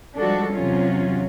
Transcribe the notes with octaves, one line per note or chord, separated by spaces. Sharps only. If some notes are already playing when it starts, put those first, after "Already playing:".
F3 G3 G#3 D4 F#4 A4
E2 C3 F#3 C#4 F4